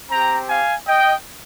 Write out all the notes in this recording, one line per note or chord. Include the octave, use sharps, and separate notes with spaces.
C4 G4 G5 A#5
F5 G#5
D#5 G5